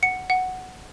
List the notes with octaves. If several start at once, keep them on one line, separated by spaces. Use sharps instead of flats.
F#5 C#7
F#5